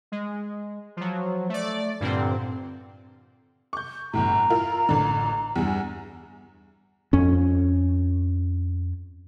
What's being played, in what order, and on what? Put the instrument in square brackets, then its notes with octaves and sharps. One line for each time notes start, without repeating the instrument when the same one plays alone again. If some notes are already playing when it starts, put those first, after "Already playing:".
[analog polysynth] G#3
F3 F#3
A3 D5
G2 A#2 D3 C4
[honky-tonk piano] C#6 G6
[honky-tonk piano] G1 E2 A2 [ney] A#5
[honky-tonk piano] E4 F4 A#4
A1 D3
E2 G2
[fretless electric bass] F2 C#4